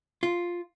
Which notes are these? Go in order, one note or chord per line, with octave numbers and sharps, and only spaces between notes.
F4